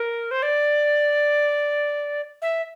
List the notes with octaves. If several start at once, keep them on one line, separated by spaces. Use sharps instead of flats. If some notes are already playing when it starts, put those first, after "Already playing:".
Already playing: A#4
C5
D5
E5